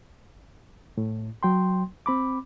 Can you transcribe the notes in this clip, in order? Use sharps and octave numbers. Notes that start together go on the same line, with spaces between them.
A2
F#3 G5 C6
C4 B5 D6